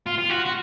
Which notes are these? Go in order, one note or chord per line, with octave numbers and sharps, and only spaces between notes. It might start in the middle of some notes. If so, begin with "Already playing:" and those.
F4
F4
F#4
F#4